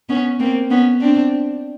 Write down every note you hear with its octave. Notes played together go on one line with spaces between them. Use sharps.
B3 C#4
A#3 C4
B3 C#4
C4 D4